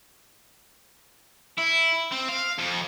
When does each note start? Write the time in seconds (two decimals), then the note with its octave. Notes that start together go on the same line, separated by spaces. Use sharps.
1.58 E4
2.12 C4
2.28 F5
2.58 F2